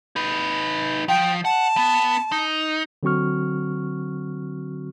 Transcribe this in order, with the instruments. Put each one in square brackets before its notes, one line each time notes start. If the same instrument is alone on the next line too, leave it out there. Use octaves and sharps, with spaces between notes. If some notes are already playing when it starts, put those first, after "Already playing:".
[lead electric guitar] D#4 B4
[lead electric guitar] F3 [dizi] G5
[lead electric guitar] F#5 [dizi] A5
[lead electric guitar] B3
D#4
[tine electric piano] D3 F#3 C4 F#4 C#6 F6